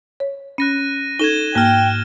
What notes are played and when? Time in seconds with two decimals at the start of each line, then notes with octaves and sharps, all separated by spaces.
0.20 C#5
0.58 C#4 F#6 A#6 D#7
1.19 D#4 A4 G#6 E7 G7
1.55 G#2 A#3 G5 F6 F#6